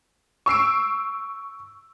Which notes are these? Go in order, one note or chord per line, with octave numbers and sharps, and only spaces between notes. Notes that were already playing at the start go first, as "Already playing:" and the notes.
C#6 E6 C7 D7